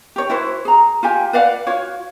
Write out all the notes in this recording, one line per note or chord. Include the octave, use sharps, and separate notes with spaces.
G4 C#5
E4 F#4 B4 C5
G#4 A#5
F4 G4 G#5
B4 D5 F5 F#5
F4 F#4 C#5 F5